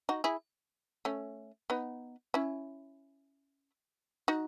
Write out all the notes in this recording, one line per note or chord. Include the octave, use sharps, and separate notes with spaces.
D#4 F#4
E4 G#4
A3 C#4
B3 D#4
C#4 E4
D#4 F#4